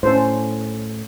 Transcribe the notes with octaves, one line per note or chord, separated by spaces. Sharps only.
A2 C#4 A4 C5